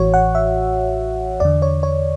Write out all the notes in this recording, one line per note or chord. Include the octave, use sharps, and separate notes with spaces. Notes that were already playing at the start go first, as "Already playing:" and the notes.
Already playing: A1 A2 E3 F#4 C#5
F#5
E5
E2 D3 D5
C#5
C#5